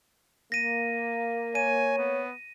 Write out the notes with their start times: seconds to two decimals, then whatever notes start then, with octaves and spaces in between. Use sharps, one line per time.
0.52 A#3 A#6 D#7
1.55 C#5 G#5 D#7
1.98 B3